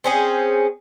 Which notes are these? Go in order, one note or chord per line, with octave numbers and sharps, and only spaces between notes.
C4 C#4 G#4